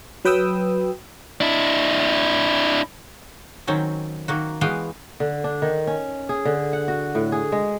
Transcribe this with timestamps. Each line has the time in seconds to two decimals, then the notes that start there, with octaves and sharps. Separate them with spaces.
0.25 F#3 B4 G5 D#6 E6
1.41 D4 E4
3.67 D#3 F#3 C4 C#4
4.28 D#3 A#3 F#4
4.61 E3 G#3 B3 F#4 F5 G5
5.20 D3
5.44 D4
5.62 D#3
5.87 C#4
6.29 G#4
6.45 D3
6.73 F#5
6.88 F#4
7.15 A2
7.32 G#4
7.52 G#3